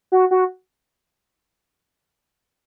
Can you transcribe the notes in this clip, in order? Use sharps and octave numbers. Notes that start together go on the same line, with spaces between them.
F#4
F#4